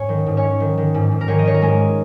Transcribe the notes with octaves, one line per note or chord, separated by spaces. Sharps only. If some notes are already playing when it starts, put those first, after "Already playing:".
Already playing: G#2 C#4 C#5
D#3
G#2
C#4 C#5
G#2
D#3
D#3
G#2
G#2
A#4
D#3 C#4 C#5
D#5
D#3 C#5
A#4
G#2 G#3 G#4